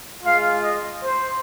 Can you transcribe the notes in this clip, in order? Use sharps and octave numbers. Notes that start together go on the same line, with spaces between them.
G#3 F4 F5
D#5
C5